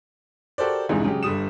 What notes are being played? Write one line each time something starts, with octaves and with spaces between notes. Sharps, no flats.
F#4 G4 A4 A#4 C5 D5
A#1 F2 G#2 C3 E3 G#3
C#3 F#3 G#3 G4
G1 G2 G3 D#6 E7